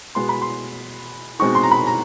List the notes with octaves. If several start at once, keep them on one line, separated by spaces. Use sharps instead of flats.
B2 G#3 B3 C6
B5
C6
B2 G#3 C4 D#4 C#6
C6
A#5
B5
A#5